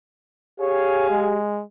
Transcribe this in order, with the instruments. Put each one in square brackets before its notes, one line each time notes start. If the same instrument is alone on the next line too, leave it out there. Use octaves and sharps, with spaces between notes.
[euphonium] G4 [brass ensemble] G#4 F5 G#5 [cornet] C#5
[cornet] G#3